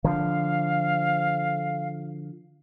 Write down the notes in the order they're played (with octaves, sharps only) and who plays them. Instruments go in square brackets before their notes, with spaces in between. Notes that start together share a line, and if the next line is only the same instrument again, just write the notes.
[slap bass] D3 F3 [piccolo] F5